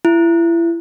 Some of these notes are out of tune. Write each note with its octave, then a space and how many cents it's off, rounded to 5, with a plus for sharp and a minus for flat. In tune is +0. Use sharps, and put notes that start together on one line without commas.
E4 +30